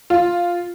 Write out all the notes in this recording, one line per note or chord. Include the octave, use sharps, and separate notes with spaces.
F4